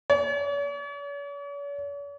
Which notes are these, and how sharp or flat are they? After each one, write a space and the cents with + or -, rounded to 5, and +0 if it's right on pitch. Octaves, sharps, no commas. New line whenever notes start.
C#5 +45